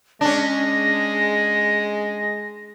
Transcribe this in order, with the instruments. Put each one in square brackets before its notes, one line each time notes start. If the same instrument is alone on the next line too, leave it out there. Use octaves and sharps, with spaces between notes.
[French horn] G#3 [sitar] C#4 D4 [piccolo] A#6